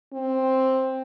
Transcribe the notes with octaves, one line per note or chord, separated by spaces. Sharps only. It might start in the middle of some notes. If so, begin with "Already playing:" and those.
C4